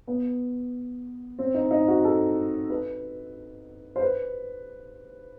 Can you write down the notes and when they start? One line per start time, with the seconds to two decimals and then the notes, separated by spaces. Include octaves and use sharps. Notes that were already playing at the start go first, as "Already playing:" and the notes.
0.07 B3
1.39 C4
1.54 D#4
1.71 D#4
1.88 F#4
2.04 A4
2.70 B4
3.96 C5
4.01 B4